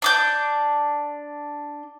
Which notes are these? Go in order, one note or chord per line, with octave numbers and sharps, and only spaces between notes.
D4 D6 G6